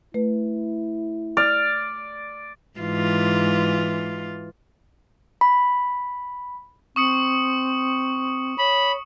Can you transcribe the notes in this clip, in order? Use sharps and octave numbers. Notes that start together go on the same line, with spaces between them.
A3 E4 B4
D5 F6
G#2 E3 F4
B5
C4 C#6 D#6 C#7
C#5 B5